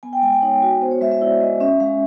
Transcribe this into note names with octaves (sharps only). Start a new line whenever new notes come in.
B3 G#5
G5
G#3 G#5
G5
D#4 C#5
F#4
B3 C5
C#5
G#3 E5
E5
E4 D5
G#3 D#5
C#4 E5
G#3 F5